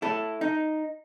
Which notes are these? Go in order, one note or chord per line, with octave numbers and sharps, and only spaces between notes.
E4 A4
D#4